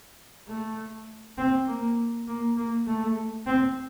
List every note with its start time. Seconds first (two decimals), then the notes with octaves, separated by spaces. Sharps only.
0.48 A3
1.38 C4
1.67 A#3
2.27 A#3
2.57 A#3
2.87 A3
3.46 C4